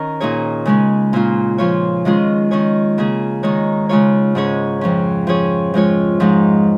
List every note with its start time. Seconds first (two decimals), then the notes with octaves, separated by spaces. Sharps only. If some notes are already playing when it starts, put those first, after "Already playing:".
Already playing: D#3 C#4 A#4
0.20 A#2 A#3 D#4 G#4 C#5
0.65 C#3 G#3 C#4
1.13 A#2 A#3 C#4 F4
1.58 F3 C#4 F4 C#5
2.05 D#3 G#3 C#4 F4 G#4
2.51 D#3 C#4 G#4 C#5
2.98 C#3 A#3 C#4 G#4
3.43 D#3 G#3 D#4 C#5
3.89 C#3 G#3 F4 C#5
4.35 G#2 G#3 C#4 G#4 C#5
4.81 F2 F3 C#4
5.27 F3 C#4 G#4 C#5
5.74 F3 G#3 F4 C#5
6.20 G#2 F3 G#3 D#4